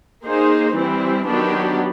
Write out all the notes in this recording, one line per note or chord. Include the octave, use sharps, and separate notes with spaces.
A#3 D#4 G#4 C5
E3 G3 C4 E4
D#3 F#3 B3 D4 G4